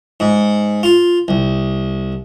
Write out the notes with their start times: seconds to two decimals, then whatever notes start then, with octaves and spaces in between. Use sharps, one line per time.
0.20 G#2
0.83 F4
1.28 C2